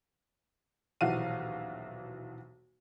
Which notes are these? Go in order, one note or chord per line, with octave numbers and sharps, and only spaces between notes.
D#1 B1 E3 F#4 F5 D#7